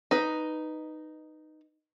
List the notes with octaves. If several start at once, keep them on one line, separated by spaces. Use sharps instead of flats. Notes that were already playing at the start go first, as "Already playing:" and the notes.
D#4 B4